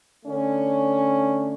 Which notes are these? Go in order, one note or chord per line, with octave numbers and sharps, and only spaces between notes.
D3 A3 C#4